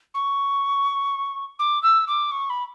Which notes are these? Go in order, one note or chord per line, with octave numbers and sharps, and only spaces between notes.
C#6
D6
E6
D6
C#6
B5